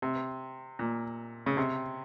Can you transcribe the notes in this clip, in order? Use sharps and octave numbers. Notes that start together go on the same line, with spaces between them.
C3
A#2
C#3
C3